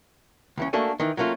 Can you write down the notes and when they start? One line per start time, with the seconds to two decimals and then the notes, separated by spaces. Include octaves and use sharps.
0.57 C#2 E3 C#4
0.73 A3 A#3 D4 F#4 A4 G#5
1.00 D#3 E3
1.17 F#3 A3 A#3 C#4 F4